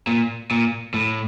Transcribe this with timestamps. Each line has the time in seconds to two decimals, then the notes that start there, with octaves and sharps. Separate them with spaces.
0.07 A#2
0.51 A#2
0.94 A2